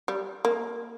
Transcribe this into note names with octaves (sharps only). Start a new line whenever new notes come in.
G3
A#3